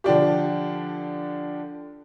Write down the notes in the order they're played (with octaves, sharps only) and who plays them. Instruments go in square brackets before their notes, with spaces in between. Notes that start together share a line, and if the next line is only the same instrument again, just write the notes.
[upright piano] D3 F3 D4 G4